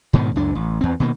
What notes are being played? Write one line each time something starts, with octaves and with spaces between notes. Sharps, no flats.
G#2 B2 D3 D#3
C#2 F#2 D4
A1
E2 C4
B2 D#3 A#3